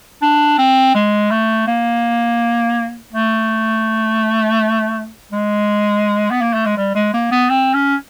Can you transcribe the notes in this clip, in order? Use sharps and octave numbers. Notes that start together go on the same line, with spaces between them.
D4
C4
G#3
A3
A#3
A3
G#3
B3
A#3
A3
G#3
G3
G#3
A#3
B3
C4
C#4